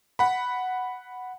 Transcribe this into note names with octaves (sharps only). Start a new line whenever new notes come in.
F#5 B5